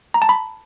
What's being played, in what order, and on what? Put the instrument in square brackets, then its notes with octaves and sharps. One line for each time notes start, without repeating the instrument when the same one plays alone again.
[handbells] A#5
A5
B5